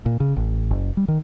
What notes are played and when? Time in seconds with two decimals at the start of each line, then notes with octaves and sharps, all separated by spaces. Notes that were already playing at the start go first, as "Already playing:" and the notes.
0.06 A#2
0.20 C#3
0.36 A1
0.71 F#1
0.97 G3
1.08 D#3